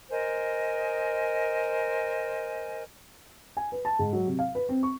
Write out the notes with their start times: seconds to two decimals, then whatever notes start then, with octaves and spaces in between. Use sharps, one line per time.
0.10 A#4 C5 D#5 G#5
3.57 G#5
3.72 B4
3.85 A5
3.99 G#2
4.13 F#3
4.27 C3
4.39 F5
4.55 B4
4.69 C4
4.83 C#6